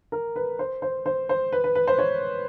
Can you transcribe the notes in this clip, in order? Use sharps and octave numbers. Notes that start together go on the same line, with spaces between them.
A#4
B4
C5
C5
C5
C5
B4
B4
B4
C5
C#5